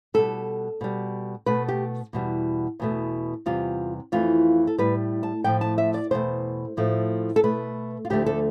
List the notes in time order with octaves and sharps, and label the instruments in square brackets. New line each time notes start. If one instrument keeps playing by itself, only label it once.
[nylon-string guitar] B2 G3 A4
B2 G3
B2 A3 B4
G4
E2 B2 G3
E2 B2 A3
E2 C3 G3 F4
F2 E3 A3 F4
A4
A2 G3 B4
A5
A2 F3 A3 G5
A5
E5
D5
E2 B2 A3 C5
A2 F3 A3
A4
B2 A3 B4
F4
D2 D3 F3 A3 G4
A4